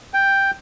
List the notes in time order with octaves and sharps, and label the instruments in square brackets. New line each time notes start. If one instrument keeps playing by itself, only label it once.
[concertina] G5